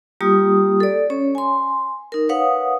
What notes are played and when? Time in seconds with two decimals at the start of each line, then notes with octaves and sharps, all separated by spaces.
0.21 G3 A#3 F4 G4 D#6
0.80 A4 D5
1.10 C#4 C#5
1.35 G#5 C6
2.12 D#4 A#4
2.29 B4 C#5 F5 F#5 D#6